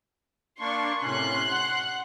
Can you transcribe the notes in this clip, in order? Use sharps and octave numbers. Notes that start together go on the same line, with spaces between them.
A#3 D4 C6 C#6
A2 C3 C#4 C6 F#6
F#5